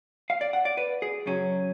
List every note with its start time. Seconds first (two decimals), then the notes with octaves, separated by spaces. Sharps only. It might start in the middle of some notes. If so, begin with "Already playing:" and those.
0.30 F5
0.41 D5
0.53 F#5
0.65 D5
0.77 B4
1.02 G#4
1.26 F#2 C#3 F#3 C#4